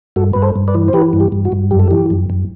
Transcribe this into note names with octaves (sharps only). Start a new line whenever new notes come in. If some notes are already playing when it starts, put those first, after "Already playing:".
G2 F#4 A4
G2 B4
A4 C5
G2
B4 D5
E3
C5
E3 G4 B4
G2
G4
G2
F#4
G2
F#2 G4
A4
E3 G4
F#2
F#2